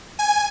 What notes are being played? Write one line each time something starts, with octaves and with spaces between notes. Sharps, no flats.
G#5